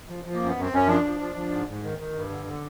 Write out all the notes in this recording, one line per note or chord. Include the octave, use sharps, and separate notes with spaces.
F3
F3
A#3
F#2
B3
F#2
C4
F#2 C#4
F3 D4
F3
F3
F3
G#2
G#2
D#3
D#3
G2
D3
D3